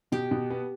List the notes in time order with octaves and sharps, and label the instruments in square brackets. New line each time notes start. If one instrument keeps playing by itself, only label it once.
[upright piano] B2 [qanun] G4
[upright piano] B2
B3